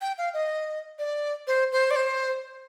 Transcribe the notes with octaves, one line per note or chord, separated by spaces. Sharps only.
G5
F5
D#5
D5
C5
C5
D5
C5